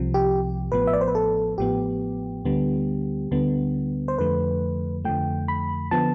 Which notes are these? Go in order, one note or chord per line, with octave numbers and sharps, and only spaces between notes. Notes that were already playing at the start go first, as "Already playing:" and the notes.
Already playing: C2 C3 F3
G4
A1 A2 F3 B3 B4
E5
D5
C5
B4
A4
A1 A2 F3 B3 G4
D2 D3 G3 B3
D2 D3 G3 B3
C5
F2 D3 F3 A3 B4
F2 D3 F3 A3 G5
B5
D3 F3 B3 A5